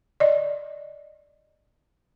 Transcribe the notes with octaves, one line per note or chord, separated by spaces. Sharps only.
D5 D#5